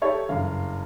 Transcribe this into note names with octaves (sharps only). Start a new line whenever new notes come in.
D#4 G4 A4 C#5
F#1 G2 F5